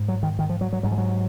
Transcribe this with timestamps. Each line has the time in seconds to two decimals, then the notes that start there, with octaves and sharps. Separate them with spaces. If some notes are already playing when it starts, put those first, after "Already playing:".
Already playing: G#2
0.08 F#3
0.23 D#3
0.39 D#3
0.49 F3
0.61 F#3
0.73 F#3
0.83 G#2 F#3
0.91 F3
0.98 F#3